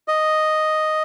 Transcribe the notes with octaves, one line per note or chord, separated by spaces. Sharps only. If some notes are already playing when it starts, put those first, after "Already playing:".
D#5